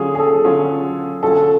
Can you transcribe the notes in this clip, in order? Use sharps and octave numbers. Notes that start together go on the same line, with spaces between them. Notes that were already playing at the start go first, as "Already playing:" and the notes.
Already playing: D3 F#3 C#4 F4 G#4
G#4
A4
D3 F#3 C#4 F4
D3 F#3 C#4 F4 A4